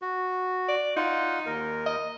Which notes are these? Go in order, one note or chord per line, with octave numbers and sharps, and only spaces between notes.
F#4
D5
D#4 F4 F#5
D#2 A#4
D#5